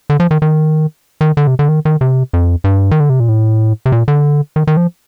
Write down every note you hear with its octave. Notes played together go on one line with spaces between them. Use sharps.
D3
F3
D#3
D#3
D#3
D3
C3
D3
D#3
D#3
C3
F2
G2
D#3
D3
C3
A#2
A2
C3
A#2
D3
D#3
D#3
F3